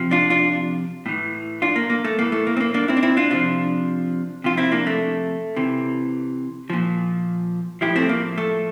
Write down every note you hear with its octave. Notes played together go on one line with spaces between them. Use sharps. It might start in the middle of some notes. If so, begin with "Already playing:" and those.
Already playing: C3 F3
D4 F4
D4 F4
A2 E3
D4 F4
A#3
A#3
A3
A2 E3 A#3
A3
A#3
C4
A#3
A#3 D4
C4 E4
D4
C4 E4
D4 F4
C3 F3 D4 F4
C3 F3 F4
C4 E4
A#3 D4
A3
C3 E3
A#2 F3
A2 F3 E4 G4
A3 C4
A#3
A3